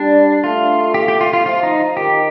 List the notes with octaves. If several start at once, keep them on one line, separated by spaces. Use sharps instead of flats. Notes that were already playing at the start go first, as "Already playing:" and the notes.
Already playing: G3 D4
A3 F4
G4
G4
F4
F4
F3 F4
D#4
D#3 G4